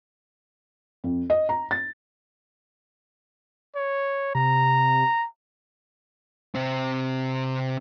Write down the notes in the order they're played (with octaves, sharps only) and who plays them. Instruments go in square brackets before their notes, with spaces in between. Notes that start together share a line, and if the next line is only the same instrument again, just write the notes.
[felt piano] F2
D#5
A#5
A6
[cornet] C#5
[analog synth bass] C3 [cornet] A#5
[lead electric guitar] C3 C4